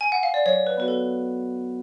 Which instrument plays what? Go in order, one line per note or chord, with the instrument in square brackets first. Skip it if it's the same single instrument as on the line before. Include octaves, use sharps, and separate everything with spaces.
[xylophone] G#5
F#5
F5
D5
[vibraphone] F#3 [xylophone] C#5
[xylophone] B4
[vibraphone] B3 F#4 [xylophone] B4
[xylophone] A4